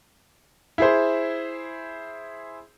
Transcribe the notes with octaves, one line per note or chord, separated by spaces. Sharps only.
E4 G#4 C5